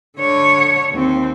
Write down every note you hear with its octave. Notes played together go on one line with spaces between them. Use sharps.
D3 C#5
D#2 C4